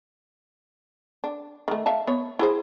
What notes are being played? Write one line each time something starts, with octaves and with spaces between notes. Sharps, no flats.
D4
D#3 A3
E5 F5 A5
B3 C#5
E4 G#4 C5